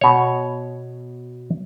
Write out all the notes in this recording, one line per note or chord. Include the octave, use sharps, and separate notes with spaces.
B2 C#5